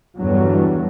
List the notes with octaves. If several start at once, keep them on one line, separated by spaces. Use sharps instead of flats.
E2 G2 D3 E3 F#3 G3